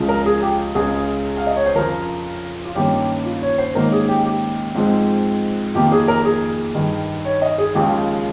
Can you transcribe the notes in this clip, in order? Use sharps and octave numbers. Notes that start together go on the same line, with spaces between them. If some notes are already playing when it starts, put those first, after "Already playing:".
Already playing: C#2 C#3 F3
A#4
G#4
G4
C#2 C#3 G#3 G#4
F5
D#5
C#5
C5
F2 C#3 F3 A#4
F4
G2 D#3 A#3 C#4 G4
F4
C#5
C5
G#2 D#3 A#3 C#4 A#4
G#4
G4
G4
G#2 F3 G#3 C4
F2 D#3 A#3 G4
G#4
A#4
G#4
G2 D#3 G3
C#5
D#5
G#4
D#2 C#3 F3 G#3 G4